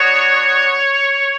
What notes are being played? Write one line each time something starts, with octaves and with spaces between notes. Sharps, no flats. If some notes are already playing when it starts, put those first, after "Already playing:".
Already playing: B3 D4 F#4 C#5